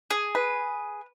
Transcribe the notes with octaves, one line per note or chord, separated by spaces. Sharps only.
G#4
B4